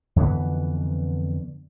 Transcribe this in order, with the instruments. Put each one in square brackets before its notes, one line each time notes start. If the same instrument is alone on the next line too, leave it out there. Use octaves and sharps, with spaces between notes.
[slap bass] F2 D3 E3 B3